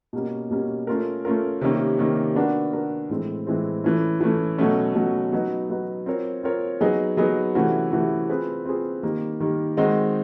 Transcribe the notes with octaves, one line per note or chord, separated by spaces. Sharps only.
B2 G3 A#3 C#4
B2 G3 A#3 C#4
A3 C#4 F4 A#4
A3 C#4 F4 A#4
C3 D#3 G3 A#3 C#4
C3 D#3 G3 A#3 C#4
B3 D4 F#4 A#4
B3 D4 F#4 A#4
A2 E3 G#3 C4
A2 E3 G#3 C4
E3 A3 C#4
E3 A3 C#4
B2 F#3 A3 C#4
B2 F#3 A3 C#4
F#3 B3 D#4
F#3 B3 D#4
C4 F4 A#4 C#5
C4 F4 A#4 C#5
F#3 B3 D#4 G#4
F#3 B3 D#4 G#4
C3 E3 A3 C#4 F#4
C3 E3 A3 C#4 F#4
C4 F4 G#4 B4
C4 F4 G#4 B4
D#3 G3 A#3
D#3 G3 A#3
D#3 G#3 C4 D#4 F#4